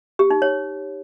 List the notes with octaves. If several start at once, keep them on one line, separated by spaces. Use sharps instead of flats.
G4
D#4
C#5